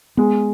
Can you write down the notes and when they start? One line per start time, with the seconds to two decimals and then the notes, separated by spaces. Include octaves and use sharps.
0.17 G#3 B3